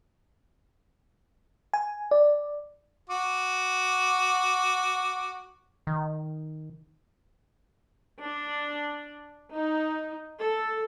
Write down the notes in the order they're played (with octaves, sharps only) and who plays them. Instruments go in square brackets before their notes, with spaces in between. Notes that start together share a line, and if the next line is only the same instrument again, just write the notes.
[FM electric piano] G#5
D5
[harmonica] F#4 D6
[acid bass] D#3
[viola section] D4
D#4
A4